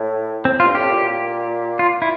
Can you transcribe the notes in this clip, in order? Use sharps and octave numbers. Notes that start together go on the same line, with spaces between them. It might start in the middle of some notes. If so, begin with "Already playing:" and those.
Already playing: A2
C4
F4
G2
A2 G4
A#2
F4
E4